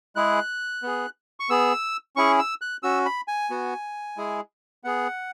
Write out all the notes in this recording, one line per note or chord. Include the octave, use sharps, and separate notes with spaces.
G#3 E4 G#4 F#6
B3 G#4
C#6
B3 G#4 E6
C#4 E4 G#4 C#6
E6
F#6
C#4 F#4 E6
B5
G#5
B3 F#4
G#3 E4 G#4
B3 G#4 F#5